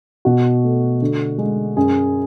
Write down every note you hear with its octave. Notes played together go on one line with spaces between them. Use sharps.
B2 F#4
A3
D3
G#3
F#2 G#4